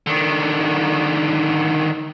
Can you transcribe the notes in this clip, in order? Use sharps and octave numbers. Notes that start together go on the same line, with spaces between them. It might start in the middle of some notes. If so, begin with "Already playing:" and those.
D3 D#3